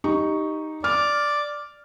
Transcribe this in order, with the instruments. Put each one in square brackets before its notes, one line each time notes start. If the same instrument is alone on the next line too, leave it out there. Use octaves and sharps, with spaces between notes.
[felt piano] D#4 G4 C#6
[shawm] D5 [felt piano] F6